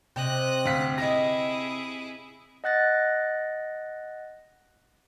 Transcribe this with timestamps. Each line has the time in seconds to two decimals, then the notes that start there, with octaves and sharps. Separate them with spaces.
0.16 C3 D#5 G5 F#6
0.65 D2 F5 B6
0.98 E4 G#4 D#5 A#6
2.64 D#5 F#5 F#6 A6 A#6